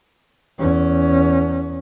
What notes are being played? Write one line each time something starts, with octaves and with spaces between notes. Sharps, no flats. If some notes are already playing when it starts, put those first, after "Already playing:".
E2 C#4